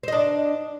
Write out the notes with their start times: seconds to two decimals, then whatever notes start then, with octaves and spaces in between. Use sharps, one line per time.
0.03 C5
0.08 D#5
0.12 D4